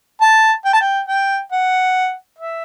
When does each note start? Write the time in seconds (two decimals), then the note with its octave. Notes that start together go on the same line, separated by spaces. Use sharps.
0.21 A5
0.65 G5
0.73 A5
0.81 G5
1.08 G5
1.52 F#5
2.39 E5